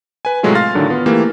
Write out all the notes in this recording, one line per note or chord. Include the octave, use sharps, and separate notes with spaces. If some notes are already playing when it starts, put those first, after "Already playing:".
B4 G#5
A2 C3 F#3 G#3 A3 F4
F5 C6 F6 A6 A#6
A2 D3 D#3 F#3 D4
B3 F4
E3 A3 A#3 G4